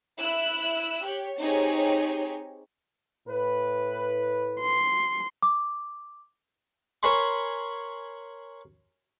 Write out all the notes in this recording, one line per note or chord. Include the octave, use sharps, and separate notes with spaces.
E4 E6 F#6
G4 C#5
C4 D#4 G4 G#4 C#5
A2 B4
C6
D6
A#4 C#5 G#5 B5 C6